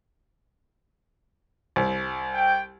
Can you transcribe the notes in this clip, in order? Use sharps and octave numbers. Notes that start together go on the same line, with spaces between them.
C2
G5